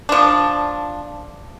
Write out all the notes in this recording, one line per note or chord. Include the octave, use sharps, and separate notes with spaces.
F3 D4